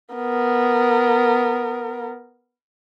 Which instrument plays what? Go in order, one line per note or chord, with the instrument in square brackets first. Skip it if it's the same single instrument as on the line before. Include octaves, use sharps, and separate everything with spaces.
[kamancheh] B3 A#4